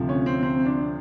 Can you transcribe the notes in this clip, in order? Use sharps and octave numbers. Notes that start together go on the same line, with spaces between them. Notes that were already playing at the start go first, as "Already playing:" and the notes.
Already playing: D2 C3 F3
C#4
C4
C4
D4